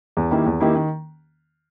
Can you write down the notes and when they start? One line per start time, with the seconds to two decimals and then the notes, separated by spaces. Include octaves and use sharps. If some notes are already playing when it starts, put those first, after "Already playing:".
0.17 E2
0.31 D#3 A#3 E4 G4
0.46 E2
0.61 D#3 A#3 E4 G4
0.75 D#3